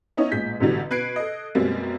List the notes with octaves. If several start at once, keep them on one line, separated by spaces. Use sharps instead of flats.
B3 C#4 D#4 E4 C#5 D#5
A1 A#2 G#3 G6 B6
A1 B2 D3 E3 F#3 G3
B2 B4 F#6 G#6 C7 D7
A4 D#5
F#2 B2 G3 G#3 A#3 C4